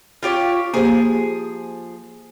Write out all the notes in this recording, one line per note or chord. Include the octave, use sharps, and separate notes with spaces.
F4 G4 C#5
F3 A#3 G4 G#4 C5